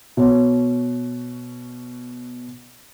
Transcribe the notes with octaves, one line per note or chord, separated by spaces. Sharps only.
B2 C#5